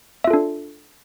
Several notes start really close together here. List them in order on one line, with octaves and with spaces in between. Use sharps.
E5 F4 A4 D4